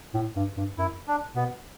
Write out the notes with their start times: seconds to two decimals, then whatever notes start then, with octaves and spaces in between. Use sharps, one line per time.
0.14 A2
0.36 G2
0.57 G2
0.78 F#2 E4
1.08 D4
1.35 B2 B3